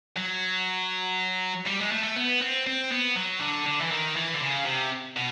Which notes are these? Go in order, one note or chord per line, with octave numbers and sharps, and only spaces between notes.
F#3
G3
G#3
A3
A3
B3
C4
C4
B3
F#3
D3
D3
E3
D#3
E3
D3
C#3
C3
B2